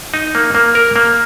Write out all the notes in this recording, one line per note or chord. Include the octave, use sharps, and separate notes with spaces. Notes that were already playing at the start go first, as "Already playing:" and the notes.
D#4
A#3
A#3
A#4
A#3